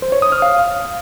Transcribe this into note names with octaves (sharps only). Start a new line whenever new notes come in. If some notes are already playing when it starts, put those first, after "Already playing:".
C5
C#5
D#6
F6
F5